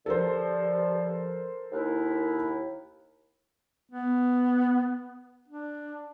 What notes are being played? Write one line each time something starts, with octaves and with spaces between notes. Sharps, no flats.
G2 D3 F3 A4 A#4 C5
D#2 E4
B3
D4